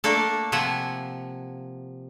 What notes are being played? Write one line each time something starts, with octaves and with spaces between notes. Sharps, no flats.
A3 A#3 D4 A4
C3 F3 E5 F#5 G#5